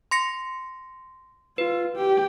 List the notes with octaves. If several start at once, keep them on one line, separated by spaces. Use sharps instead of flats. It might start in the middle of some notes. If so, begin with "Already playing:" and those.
C6 A#6 C#7
F4 B4
G4